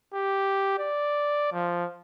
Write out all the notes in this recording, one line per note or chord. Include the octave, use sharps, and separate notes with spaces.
G4
D5
F3